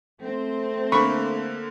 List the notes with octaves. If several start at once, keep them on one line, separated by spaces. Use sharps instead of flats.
A3 C4
D3 A#3 B5 C#6